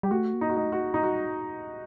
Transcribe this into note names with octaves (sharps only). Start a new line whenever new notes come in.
G3 G4
A3 F#4
A#3
D#4
F#4
A3 D#4
F#4
A#3
D#4
G3 F#4